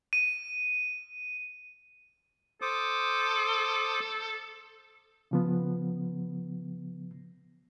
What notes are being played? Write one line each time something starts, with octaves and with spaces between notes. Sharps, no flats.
D#7
A4 C5 D6 D#6
C#3 F3 B3